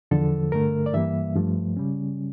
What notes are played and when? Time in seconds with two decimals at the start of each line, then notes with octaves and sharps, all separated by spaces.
0.11 E2 D3 F3 A4
0.52 G2 D3 A3 A#4
0.86 D5
0.93 G2 E3 G3 A#3 E5
1.35 G2 F3 A3
1.77 C#3 G3 C#4